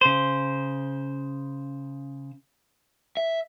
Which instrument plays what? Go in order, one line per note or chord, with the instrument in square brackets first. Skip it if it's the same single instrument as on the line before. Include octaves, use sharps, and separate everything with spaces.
[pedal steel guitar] C#3 C5
[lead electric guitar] E5